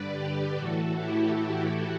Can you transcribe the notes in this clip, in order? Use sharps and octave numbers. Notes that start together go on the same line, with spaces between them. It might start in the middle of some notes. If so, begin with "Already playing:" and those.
Already playing: G2 D3 B4 D5
G4 B4
A2 E3 F#4 A4
E4 G4